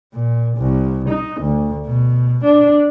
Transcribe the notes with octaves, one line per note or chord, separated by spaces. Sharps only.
A#2
C2
D#4
D2
B2
D4